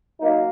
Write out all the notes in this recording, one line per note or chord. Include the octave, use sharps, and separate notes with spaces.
F#3 A#3 D#4